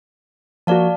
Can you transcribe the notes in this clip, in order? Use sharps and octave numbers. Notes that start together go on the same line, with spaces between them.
F3 A#3 F#4 D5 F5 A5